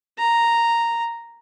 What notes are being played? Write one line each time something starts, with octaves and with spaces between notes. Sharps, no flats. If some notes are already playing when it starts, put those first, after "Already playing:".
A#5